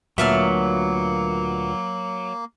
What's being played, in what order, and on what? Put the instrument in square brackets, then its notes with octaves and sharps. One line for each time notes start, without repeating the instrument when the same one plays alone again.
[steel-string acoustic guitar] D2 A#2 B3 [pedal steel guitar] F#3 [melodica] A#3 [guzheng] E5 F5 A5